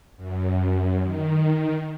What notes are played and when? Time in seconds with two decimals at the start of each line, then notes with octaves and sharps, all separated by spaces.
0.17 F#2
1.02 D#3